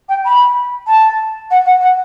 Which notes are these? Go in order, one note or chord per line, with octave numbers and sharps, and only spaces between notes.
G5
B5
A5
F#5
F#5
F#5